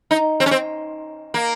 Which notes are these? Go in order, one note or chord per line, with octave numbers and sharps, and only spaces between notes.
D#4
C4
C#4
C4
A#3